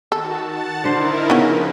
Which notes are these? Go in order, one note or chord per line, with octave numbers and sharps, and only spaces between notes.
D#3 F#4 A4 A5
F#5 A5 A6
D3 D#4 E4 A#4 C5
C#3 F3 B3 C#4 B4